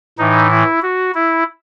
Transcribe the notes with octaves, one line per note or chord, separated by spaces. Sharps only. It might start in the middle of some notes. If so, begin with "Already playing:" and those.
A2 E3 D#4
E4
F#4
E4